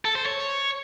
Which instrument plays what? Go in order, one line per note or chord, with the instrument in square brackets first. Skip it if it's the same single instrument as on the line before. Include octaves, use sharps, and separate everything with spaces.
[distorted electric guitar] A4
C5
C#5